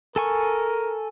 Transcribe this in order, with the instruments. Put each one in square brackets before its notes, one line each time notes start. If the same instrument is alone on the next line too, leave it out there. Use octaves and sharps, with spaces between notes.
[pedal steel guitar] A4 G#5 C#6 [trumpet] A#4